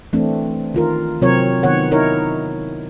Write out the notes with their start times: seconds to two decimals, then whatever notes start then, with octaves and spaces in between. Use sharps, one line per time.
0.13 E3 A3 C4 D4
0.74 D#3 F4 A#4
1.21 C3 F#3 C4 F4 A#4 C#5
1.63 D#3 B3 C#5 F#5
1.91 D#4 E4 A#4 C#5